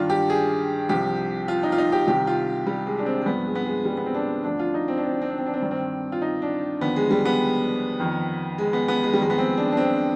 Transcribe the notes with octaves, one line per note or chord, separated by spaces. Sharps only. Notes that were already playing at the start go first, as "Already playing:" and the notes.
Already playing: G2 D#3 D4 F4
G4
G#4
C2 C3 F3 G4
F4
D#4
F4
D#4
G4
C2 C3 D#3 G4
F4
G3
G#3
D4
C4
G#3
G2 F3 B3
G#3
B3
G#3
G3
B3
C4
D4
D2 D3 F3 D4
F4
D#4
C4
D4
C4
D4
C4
D4
C4
D4
C4
G2 D#3 D4
C4
F4
D#4
D4
D#2 D3 F3 B3
G#3
G3
B3
F2 D#3
G#3
B3
B3
G#3
G3
F2 D#3 G#3
B3
C4
D4
D4
C4